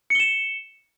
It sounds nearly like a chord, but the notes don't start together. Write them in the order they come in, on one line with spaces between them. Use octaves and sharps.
C#7 G7 E7